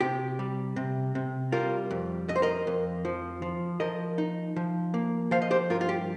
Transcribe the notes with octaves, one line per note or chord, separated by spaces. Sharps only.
C3 G4
G3
C3
C3
G3 F4 A#4
F2
F2 D#5
C5
A#4 D#5
F2
F3
F3
F3 A#4 D#5
D#4
F3
A#3
F3 C5 F5
D#5
G4 C5
G2 F4 A#4
F4
G4